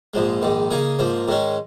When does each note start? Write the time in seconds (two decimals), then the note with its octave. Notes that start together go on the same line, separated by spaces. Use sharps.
0.14 A#1 G#2 F3 G#3
0.42 A#1 G#2 D#3
0.71 C#3 A#3 D#4 G#4
0.99 G#2 F3 A#3
1.28 G#2 D#3 G#3 C#4